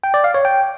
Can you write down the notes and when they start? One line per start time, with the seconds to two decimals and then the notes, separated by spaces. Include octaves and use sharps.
0.04 G5
0.14 D5
0.24 F5
0.34 C#5
0.45 G5